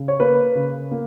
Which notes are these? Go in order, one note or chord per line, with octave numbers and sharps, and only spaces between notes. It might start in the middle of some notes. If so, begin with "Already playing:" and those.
Already playing: C#3
C#5
A#3 B4
C#3
A#3